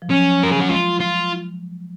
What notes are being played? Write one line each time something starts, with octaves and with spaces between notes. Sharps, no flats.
F3
F#3 C#4
F#3 A#4
G#4
F#4
G#3 F4
F4